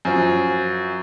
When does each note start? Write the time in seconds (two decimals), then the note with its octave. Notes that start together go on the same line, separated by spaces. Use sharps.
0.05 F#2 F3